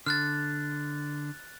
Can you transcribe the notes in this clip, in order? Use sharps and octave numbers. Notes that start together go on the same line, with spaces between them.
D3 F6 F#6 A6